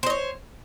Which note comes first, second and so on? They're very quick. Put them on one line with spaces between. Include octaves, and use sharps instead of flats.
C5 D#5 C#5